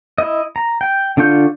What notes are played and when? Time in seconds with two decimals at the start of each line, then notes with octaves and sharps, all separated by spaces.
0.18 E4 D#5
0.56 A#5
0.81 G5
1.17 D3 D4 F4 C#6 G6